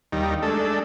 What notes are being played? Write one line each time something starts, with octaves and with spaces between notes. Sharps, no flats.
D#2 G3 D#4
G#3 A3 D4 A4